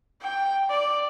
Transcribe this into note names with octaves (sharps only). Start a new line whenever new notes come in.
G5
D5